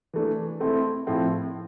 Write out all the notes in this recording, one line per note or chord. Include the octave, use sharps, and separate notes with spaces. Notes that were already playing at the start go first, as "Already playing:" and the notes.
E3 A3 D4
A3 C4 E4 A4
A2 F3 A3 C4 E4